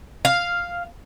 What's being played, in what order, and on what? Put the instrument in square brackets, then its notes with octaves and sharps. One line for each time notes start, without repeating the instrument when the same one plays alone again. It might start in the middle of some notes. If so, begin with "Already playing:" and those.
[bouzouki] F5